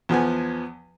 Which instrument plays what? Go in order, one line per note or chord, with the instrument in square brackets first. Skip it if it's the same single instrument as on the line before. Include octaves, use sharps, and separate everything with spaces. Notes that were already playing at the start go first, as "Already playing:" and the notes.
[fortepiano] E2 F3 B3 G#5